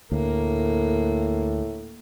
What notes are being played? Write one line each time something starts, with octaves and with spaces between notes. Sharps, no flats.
D2 A2 A#3